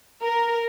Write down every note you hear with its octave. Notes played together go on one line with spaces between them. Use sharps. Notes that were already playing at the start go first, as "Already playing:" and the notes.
A#4